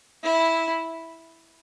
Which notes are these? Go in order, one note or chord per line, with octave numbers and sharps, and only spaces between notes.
E4